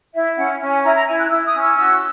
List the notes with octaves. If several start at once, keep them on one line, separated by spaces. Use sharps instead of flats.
E4 E5
C#4 F#5
C#4
G#5
E4 A#5
A#5
E4 G#5
F#6
E4 E6
D#6
C#4
E6
F#4 E6